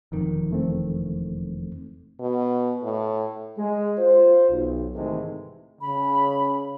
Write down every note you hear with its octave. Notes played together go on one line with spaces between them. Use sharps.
E1 F2 D#3
E3 A3 C4
B2
A2
G#3
F4 C5
B1
G#2 C3 D#3 E3 G#3 A3
C#3 B5